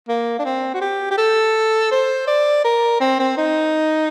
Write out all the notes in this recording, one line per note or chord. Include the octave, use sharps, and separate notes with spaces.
A#3
D4
C4
F#4
G4
G4
A4
C5
D5
A#4
C4
C4
D#4